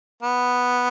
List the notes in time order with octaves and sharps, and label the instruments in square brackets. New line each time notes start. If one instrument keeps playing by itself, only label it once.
[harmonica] B3